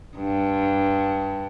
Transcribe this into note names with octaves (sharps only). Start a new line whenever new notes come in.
G2